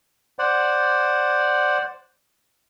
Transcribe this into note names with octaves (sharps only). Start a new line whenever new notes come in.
C5 D5 F#5